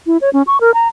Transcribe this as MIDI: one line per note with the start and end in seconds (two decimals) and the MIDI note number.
0.07 0.17 64
0.21 0.30 73
0.33 0.43 61
0.47 0.60 85
0.61 0.74 70
0.74 0.88 82